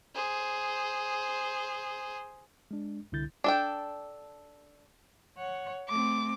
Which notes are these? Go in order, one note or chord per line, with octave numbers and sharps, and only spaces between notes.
G#4 C5
G#3 D4
C2 D3 E4 G6 A6
D4 A4 G5
C#5 F#5
A3 C4 D6